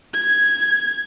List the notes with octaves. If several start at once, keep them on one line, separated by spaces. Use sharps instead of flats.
G#6